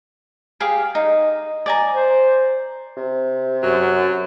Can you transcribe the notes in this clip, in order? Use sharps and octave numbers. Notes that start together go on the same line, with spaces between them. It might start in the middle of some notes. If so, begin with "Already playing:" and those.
G4 G#4 F5
D#4
D5 G#5 A#5
C5
C3
F#2 F#3